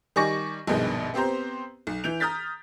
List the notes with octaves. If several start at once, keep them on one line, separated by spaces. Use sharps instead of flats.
D#3 G3 G#5 C#6 D6 A#6
A#1 G2 B2 D#3 G#3
B3 C4 G4 C5 A#5
B1
E3 G6 D7 F7
A#5 D#6 F6 G6 A6 B6